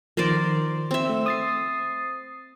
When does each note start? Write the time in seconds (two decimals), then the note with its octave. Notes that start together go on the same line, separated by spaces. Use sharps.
0.17 D#3 F3 A#4 C5 D5
0.91 C4 E5
1.10 A3
1.26 D#6 A6 C7